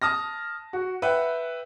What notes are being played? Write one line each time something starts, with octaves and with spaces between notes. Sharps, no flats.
A5 D#6 F6 A#6
F#4
B4 E5 F#5 G5